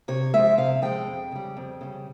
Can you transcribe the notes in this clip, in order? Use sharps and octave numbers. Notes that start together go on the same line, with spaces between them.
C3 C#5
F3 G#3 E5
C3 F5
F3 G#3 G5
F2
C#3 G3
F2
C#3 G3